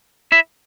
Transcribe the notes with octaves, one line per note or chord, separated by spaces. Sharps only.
E4 E5